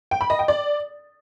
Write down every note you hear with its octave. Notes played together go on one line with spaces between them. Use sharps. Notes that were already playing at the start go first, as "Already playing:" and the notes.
G5
B5
D#5
G5
D5